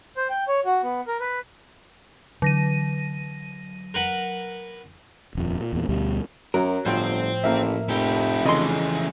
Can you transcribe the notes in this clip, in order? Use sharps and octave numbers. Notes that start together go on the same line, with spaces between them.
C5
G5
C#5
F#4
B3
A#4
B4
D3 E3 F#3 A#6 D#7
A#4 B4 F#5
D#1 F2
A#2
E2 A#2
D2 B2 G3
F#2 F#3 A#4
G1 A2 F3 F4 C5 G5
A1 A#3 A#4 E5
F1 E4 G4
C#3 E3 F3 G#3 A3 D#5 C6